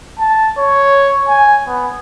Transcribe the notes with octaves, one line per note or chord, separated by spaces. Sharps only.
A5
C#5
G#5
B3